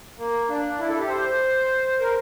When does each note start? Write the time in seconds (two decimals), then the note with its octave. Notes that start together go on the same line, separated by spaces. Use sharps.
0.17 A#3
0.49 D4
0.79 E4
0.89 A4
0.99 G4
1.09 C5
2.00 A#4